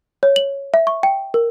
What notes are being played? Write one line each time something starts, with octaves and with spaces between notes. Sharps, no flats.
C#5
F#7
E5
C#6
G5
A#4